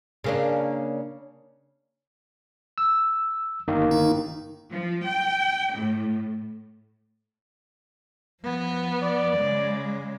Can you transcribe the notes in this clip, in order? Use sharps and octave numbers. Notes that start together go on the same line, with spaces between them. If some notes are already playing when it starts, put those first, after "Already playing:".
C#3 A#3 D4
E6
G1 D#3 A#3
D#4
F3
G5
A2
F3 B3
D5
C#3 G#3